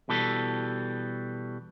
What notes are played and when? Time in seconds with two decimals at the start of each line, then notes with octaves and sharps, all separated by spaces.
0.09 B2 E3 G3 A4